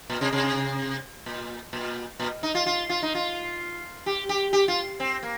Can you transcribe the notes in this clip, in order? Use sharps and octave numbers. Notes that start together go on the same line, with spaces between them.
A#2
C3
C3
A#2
A#2
A#2
D#4
F4
F4
F4
D#4
F4
G4
G4
G4
F4
C4
A#3